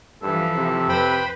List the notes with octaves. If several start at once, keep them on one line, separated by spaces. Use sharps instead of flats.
G2 E3 F3 A4
C3
F2 B4 C5 G5 B5